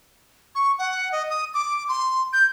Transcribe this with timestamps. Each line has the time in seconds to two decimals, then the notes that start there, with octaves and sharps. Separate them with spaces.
0.55 C#6
0.79 F#5
1.12 D#5
1.30 D#6
1.54 D6
1.88 C6
2.33 G6